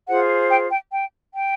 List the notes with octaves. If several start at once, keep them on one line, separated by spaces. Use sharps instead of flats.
F4 G#4 C5 F#5
G5
G5
G5
G5